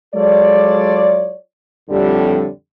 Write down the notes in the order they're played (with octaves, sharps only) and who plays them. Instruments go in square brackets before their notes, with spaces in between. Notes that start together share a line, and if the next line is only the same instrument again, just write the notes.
[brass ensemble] F#3 G#3 F4 A4 C#5 D5
F2 A2 D3 G3